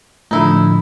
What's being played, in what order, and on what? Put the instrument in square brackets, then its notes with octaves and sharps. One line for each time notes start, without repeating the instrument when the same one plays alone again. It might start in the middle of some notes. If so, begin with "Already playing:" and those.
[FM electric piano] A2 D3 F3 [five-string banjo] D#4 E4